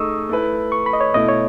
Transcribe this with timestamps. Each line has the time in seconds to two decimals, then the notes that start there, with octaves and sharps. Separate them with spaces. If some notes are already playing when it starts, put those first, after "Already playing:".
Already playing: A3 D#4 G#4 D#5 C#6 D#6 E6
0.29 A3 E4 B4
0.72 C#6
0.86 B5
0.93 D#5
1.01 C#5
1.14 B2 A3 E4 D#5
1.29 C#5